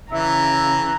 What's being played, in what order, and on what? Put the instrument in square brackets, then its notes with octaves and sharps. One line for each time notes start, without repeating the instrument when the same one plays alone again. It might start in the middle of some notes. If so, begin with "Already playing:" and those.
[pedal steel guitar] C#3 [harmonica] E3 [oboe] E5 [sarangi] A#5